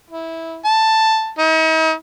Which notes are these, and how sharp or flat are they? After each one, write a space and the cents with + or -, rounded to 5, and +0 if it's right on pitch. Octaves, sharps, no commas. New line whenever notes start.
E4 -15
A5 +5
D#4 +45